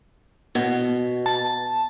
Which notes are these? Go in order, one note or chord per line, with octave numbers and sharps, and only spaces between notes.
B2
A5